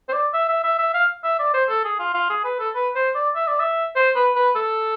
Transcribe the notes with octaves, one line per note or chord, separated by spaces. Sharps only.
C5
D5
E5
E5
E5
E5
F5
E5
D5
C5
A4
G#4
F4
F4
G#4
B4
A4
B4
C5
D5
E5
D5
E5
C5
B4
B4
A4